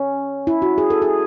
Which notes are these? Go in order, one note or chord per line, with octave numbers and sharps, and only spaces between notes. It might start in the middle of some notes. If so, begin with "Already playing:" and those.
Already playing: C#4
E4
F#4
G#4
A4
G#4